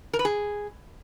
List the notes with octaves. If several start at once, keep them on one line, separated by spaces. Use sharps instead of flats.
A#4
B4
G#4